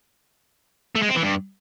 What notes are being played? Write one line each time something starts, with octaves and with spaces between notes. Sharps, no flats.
A3
G#3
C4
E3
G2